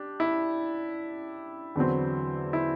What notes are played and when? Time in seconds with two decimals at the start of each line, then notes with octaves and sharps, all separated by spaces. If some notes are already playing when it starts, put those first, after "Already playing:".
Already playing: D4 G4
0.20 E4
1.75 E2 D3 F#3 C4
2.53 E4